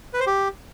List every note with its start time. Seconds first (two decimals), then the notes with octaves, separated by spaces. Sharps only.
0.14 B4
0.20 C5
0.27 G4